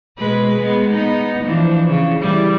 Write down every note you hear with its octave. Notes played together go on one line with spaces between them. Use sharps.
B2 G#3 B4
G#3 B3
B3 D#4
E3 F3 D4
C#3
E3 G3 E4